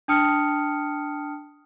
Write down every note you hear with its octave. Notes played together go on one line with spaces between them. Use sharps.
D4 G5 A5 D#6 F6 C#7